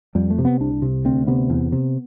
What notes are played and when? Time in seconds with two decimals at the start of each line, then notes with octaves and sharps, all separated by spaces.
0.15 F2 G3
0.30 A3
0.38 C3
0.45 B3
0.60 C2 D4
0.82 C3
1.05 D2 C4
1.27 C3 B3
1.50 E2
1.72 C3